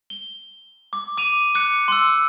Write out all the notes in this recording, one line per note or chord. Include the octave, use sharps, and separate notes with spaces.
G7
D6
D6 D#7 F7
D6 F#6 C#7
C6 E6